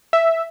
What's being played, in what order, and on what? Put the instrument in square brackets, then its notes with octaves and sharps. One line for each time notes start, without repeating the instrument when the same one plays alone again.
[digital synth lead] E5